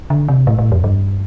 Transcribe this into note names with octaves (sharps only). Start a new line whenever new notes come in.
D3
C3
A2
A2
F2
G2